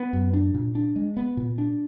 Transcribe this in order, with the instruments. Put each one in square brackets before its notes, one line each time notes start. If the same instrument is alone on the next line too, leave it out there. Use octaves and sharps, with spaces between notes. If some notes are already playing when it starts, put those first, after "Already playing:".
Already playing: [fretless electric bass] B3
F#2
D4
A#2
D4
G#3
B3
A#2
D4